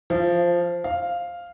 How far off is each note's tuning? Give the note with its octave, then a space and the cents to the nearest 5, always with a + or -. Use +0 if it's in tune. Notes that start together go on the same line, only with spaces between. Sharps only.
F3 +0 F5 -30
C5 +15 F5 +0